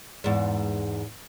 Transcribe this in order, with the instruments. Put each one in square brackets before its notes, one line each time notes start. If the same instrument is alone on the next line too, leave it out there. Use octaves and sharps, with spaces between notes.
[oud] E2 G#2